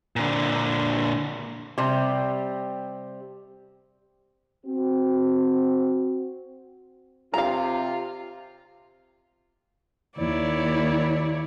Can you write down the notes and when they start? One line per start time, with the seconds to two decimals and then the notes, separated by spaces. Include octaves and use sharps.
0.16 A#2 D3
1.78 C3 G3
4.66 C4 F#4
7.34 C3 F4 F5 A#5
10.16 D#2 E4 C#5 D5